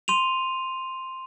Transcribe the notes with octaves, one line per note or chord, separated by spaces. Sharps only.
C6 D#7 F7